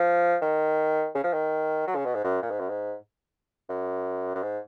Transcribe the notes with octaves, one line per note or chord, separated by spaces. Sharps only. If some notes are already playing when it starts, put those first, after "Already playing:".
Already playing: F3
D#3
C#3
F3
D#3
F#3
C#3
B2
G#2
F#2
A#2
G#2
F#2
G#2
F#2
F#2
G#2